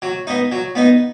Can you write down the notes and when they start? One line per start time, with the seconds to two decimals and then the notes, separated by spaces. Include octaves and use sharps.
0.02 F#3
0.27 B3 D#4
0.52 F#3
0.75 B3 D#4